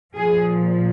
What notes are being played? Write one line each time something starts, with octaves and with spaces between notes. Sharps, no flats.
A#2 F3 G#4